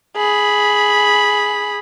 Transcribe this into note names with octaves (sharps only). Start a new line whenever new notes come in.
G#4 B5